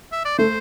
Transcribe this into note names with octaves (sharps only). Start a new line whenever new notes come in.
E5
D5
A3 C5